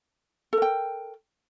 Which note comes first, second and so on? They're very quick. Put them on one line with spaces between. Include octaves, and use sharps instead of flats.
A4 A#4 G5